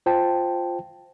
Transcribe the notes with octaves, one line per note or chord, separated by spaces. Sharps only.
F4 C5 G5 A5